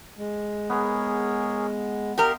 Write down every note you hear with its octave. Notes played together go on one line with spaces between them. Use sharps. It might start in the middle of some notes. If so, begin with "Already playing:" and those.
G#3
B3 G#4 A#4 C#5
G4 A#4 D#5 F5 C6